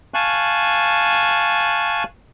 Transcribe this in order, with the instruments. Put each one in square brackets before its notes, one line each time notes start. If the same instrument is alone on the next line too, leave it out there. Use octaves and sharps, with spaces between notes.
[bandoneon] F5 G#5 A5 C#6 F#6